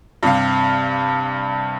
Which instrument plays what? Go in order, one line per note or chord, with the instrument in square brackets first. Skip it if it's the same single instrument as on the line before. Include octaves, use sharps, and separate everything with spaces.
[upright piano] G2 C3 F5